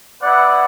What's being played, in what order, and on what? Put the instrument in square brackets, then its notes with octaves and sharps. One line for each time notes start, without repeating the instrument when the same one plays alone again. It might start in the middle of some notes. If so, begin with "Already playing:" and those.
[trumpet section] B3 E4 B4 D5 F#5